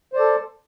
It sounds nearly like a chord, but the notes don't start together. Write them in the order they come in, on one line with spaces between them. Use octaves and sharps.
C5 D5 A4